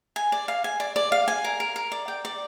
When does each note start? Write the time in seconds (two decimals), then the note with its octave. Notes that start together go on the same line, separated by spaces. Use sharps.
0.16 G#5
0.32 D5
0.48 F5
0.64 G#5
0.80 D5
0.96 D5
1.12 F5
1.28 G#5
1.44 A#4
1.60 A#4
1.76 A#4
1.92 D5
2.08 G5
2.25 D5